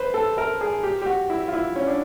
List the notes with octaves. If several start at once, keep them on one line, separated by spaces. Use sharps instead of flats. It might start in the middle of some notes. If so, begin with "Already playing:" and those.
Already playing: B4 C5
A4
A#4
G#4
G4
G4
F#4
E4
F4
E4
C#4
D4